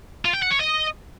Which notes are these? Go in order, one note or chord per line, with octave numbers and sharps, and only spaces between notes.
F4
G5
F#5
C#5
D#5